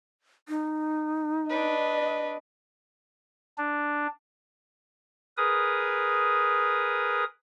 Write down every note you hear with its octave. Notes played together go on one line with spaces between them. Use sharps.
D#4
D4 B4 D#5
D4
G#4 A#4 B4 D#6